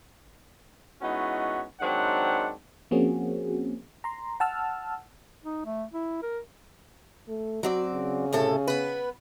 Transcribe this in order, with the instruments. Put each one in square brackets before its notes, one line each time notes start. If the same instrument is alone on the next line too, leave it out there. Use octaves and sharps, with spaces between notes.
[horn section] G#3 B3 C#4 D#4 E4 F#4
G#2 D#3 F#3 C4 D4 F#5
[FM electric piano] F3 A#3 C4 C#4 F#4 G#4
A#5 C6
F#5 A5 E6 F6
[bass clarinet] D#4
A3
E4
A#4
[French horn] A3
[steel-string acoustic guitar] F#3 C4 D5 [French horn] F#4
[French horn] C#3
[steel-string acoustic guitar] A2 C3 A4
B3 B4